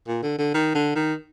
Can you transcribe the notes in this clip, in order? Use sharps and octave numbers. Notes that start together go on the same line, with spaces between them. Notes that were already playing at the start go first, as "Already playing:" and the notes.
A#2
D3
D3
D#3
D3
D#3